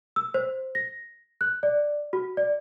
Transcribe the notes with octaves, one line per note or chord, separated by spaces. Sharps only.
E6
C5
A#6
F#6
D5
F#4
D5